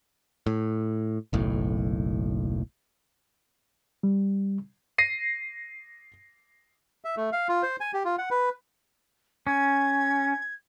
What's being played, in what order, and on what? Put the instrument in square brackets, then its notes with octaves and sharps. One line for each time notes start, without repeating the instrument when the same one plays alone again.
[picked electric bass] A2
F#1 B1 A2
[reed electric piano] G3
[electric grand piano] A#6 C7 D#7
[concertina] E5
A3
F5
F4
C5
G#5
G4
F4
F#5
B4
[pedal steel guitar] C#4 [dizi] G#6